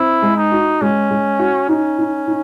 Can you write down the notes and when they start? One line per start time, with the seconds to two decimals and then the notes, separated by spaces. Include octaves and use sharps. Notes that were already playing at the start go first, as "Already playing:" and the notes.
Already playing: C4 E4
0.22 G#3
0.37 D#4
0.52 F#4
0.82 G#3 C#4
1.11 G#3
1.39 F#4
1.69 C#4 D#4
1.99 D#4
2.28 D#4